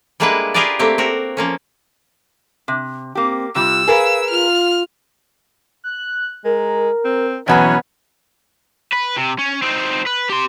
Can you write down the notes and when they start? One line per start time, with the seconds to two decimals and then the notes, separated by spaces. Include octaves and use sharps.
0.20 G3 G#3 A#3 D4 E4 B4
0.54 F4 G4 G#4 A#4 B4 D5
0.79 A3 A#3 C4 G4
0.98 C4 F#4 A#4
1.37 F3 A#3 C#4
2.68 C3
3.15 A#3 C4 G4
3.55 C3 G3 F4 E6
3.88 G#4 A#4 B4 F5
4.30 F4 F6
5.84 F#6
6.45 G#3 A#4
7.05 C4
7.48 B2 E3 F#3 B3 C#4 G#5
8.93 B4
9.17 C3
9.39 C#4
9.62 C4 D#4
10.07 B4
10.30 G4 C6